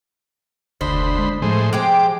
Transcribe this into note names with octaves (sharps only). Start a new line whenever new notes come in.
F1 D2 C5 D#5 B5
G#3
A2 F3 G#3 C5
G#3 G4 C5 D6